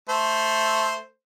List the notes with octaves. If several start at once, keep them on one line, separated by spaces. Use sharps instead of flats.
A3 C5